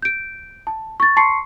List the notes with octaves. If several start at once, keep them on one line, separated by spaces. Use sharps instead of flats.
G6 D7
A5
C#6 A6
A5 C6 C#6 C7 C#7